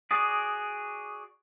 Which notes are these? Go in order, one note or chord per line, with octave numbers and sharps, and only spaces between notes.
F#4 G#4 D5 D#6